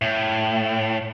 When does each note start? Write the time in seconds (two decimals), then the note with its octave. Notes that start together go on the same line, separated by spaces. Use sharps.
0.02 A2